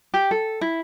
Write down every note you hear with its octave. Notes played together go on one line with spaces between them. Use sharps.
G4
A4
E4